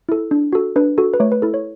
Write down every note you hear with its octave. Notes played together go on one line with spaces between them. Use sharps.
E4 A4
D4
F#4 A4
D4 B4
F#4 A4
B4
A3 C#5
B4
E4 A4
C#5